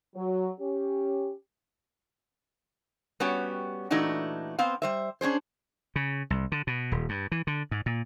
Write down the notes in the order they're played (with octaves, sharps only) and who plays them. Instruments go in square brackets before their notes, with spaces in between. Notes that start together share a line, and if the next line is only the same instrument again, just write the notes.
[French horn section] F#3
C#4 G4
[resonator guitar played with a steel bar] G3 B3 C#4 F#4 G4 C#5
A#2 E3 A3 D4 D#4 F#4
B3 C4 C5 F5
G3 C5 E5
C#4 D4 G#4 C5
[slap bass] C#3
C2
D3
B2
D#1
G2
E3
D3
G#2
A#2